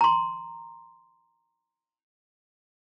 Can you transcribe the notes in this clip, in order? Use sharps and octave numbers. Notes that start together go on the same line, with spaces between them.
A#5 C6